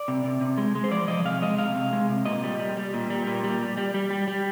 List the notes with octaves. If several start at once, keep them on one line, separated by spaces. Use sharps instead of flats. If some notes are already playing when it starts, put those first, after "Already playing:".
Already playing: D5
C3
C3
C3
G#3
G#3
C5
F3 D5
F3 D#5
C3 F5
G#3 D#5
C3 F5
C3
G#3
C3
A#2 D#5
G3
G3
G3
A#2
G3
A#2
G3
G3
G3
G3
G3
G3